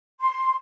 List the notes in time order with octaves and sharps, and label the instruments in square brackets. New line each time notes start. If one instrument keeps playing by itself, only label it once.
[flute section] C6